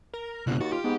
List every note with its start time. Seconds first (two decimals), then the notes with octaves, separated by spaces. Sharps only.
0.14 A#4
0.47 G1 C#2 B2 F#6
0.61 D#2 F#4 A6
0.72 F4 G4
0.84 G#2 B3